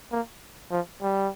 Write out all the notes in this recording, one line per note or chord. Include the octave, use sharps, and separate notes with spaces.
A#3
F3
G3